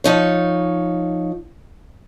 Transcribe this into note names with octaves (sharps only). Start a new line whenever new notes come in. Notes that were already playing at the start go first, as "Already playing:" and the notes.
F3 D#4 C#5